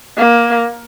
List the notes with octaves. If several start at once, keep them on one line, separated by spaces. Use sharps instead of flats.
A#3